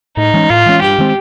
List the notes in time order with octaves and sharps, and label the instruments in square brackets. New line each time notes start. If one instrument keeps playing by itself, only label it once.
[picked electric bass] A2 [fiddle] D#4
[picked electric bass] E3 G#3 C#4
[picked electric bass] A2 [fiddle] F4
[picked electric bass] E3 G#3 C#4
[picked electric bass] G2 [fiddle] G4
[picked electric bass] D#3 G#3 C4